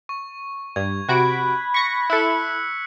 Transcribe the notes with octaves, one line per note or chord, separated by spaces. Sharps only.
C#6
G2 G#6
C3 F#4 B5 F#6 D7
C#6 A#6 B6 C#7
E4 A4 E6 F#6 C#7